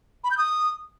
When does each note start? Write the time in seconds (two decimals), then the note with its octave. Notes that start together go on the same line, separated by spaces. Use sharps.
0.24 B5
0.31 G6
0.38 D#6